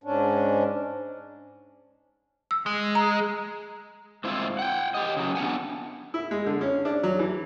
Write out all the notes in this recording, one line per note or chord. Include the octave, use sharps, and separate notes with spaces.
G#2 C#4 D4
E6
G#3
A#5
G#2 C4 E4 F4
F#5 G5
G4 D#5
C#3 F#3
B3 D4 F#5 G#5
E4
G#3
D3
C#4
D4
F#3
E3